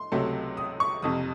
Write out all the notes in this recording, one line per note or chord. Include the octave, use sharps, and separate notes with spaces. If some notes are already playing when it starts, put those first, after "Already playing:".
Already playing: C6
C#2 C3 F#3 A3
D#6
C#6
F#1 F2 C3 D#6